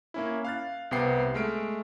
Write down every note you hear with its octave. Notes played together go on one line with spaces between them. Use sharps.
A#3 C#4 E4
F5 F#6 A6
C2 C3 B3 G5 C7
G#3 A3 F6 D7